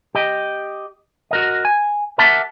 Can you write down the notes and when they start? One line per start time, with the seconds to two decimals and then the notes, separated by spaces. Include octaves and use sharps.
0.15 G4 D#5
1.31 F#4 A#4 D#5
1.65 G#5
2.18 G4 A#4 E5 F#5 A5